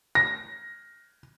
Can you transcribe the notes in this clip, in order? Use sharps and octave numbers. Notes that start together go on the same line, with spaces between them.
A#6